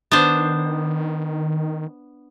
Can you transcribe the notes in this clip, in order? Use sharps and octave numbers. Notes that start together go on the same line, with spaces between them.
D#3 B3 D4 C5